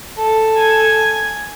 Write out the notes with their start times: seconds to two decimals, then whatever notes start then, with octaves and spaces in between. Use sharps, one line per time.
0.18 A4
0.57 G#5